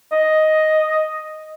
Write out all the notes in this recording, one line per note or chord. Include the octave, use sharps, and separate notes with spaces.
D#5